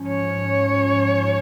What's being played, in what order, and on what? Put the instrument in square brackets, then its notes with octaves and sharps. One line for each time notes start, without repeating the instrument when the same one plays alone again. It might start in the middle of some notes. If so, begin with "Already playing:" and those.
Already playing: [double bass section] G#2 F3 C#4
[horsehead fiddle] C#5